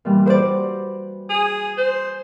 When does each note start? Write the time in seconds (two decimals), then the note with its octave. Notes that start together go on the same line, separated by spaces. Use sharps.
0.05 A#2 E3 G3
0.27 F#4 B4 C5 D5
1.30 G#4
1.77 C5